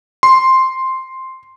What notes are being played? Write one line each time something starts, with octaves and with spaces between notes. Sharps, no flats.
C6